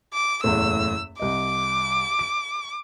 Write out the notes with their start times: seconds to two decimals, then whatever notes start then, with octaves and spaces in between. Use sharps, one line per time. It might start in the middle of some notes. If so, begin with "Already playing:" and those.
0.14 D6
0.44 F#1 E2 A2 E6
1.19 C2 D#5 D6
2.19 D7